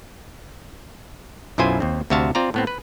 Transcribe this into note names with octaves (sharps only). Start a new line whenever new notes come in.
B1 F#2 E4 F4 C5 G#5
D#2 C4
D2 C3 F#4 E5 F5 A5
C4 F4 D5 A#5
A2 B3 C4
B4